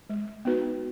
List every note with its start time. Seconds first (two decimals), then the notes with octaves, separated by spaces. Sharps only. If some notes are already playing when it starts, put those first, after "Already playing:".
0.10 G#3
0.45 B3 D#4 F#4 B4